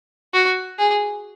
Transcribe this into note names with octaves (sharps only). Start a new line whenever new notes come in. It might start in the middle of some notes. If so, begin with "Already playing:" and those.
F#4
G#4